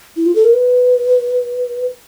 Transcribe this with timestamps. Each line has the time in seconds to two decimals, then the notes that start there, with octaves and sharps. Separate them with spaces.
0.16 E4
0.26 F4
0.35 A4
0.44 A#4
0.54 B4